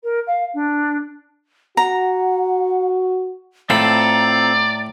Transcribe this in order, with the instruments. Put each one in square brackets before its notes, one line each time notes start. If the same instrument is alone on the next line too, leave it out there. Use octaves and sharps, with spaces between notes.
[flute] A#4
F5
D4
[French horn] F#4 [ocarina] F#5 [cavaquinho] A#5
[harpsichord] A2 B5 [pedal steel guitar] C4 F4 A4 [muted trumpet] D5 [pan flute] A#5